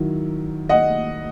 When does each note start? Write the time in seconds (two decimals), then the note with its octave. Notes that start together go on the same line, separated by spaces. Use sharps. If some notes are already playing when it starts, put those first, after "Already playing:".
Already playing: D#3 F#3 E4
0.69 D#5 F#5